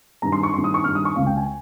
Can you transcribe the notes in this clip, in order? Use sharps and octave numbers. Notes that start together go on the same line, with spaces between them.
G2 D#3 A#5
C6
C#6
G2 D#3 C6
D#6
C#6
G2 D#3 F6
D#6
C#6
C#2 C#3 F5
G5
G#5